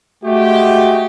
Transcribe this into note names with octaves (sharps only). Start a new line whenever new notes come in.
G#3 A3 F#4 G4